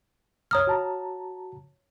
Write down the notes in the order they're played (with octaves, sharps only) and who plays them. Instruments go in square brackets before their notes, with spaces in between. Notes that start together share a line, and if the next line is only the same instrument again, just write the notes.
[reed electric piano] C2 F#2 A#5 [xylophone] C#5 D#6 F6
[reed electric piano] F#4 A5 A#5